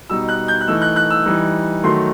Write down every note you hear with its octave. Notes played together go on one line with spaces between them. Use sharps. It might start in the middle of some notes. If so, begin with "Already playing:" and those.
B2 G3 D#4 E6
F#6
G6
F#6
E3 A3 D#4 E6
F#6
F#6
E6
E3 G3 D#4
D#3 F#3 A3 C6